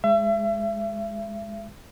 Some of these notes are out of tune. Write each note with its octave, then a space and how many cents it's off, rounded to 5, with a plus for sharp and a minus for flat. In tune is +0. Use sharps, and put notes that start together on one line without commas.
G#3 +0 E5 +35